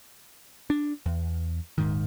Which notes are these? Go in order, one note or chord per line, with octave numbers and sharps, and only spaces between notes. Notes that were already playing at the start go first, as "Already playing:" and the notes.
D4
E2
D#1 G#2 D#3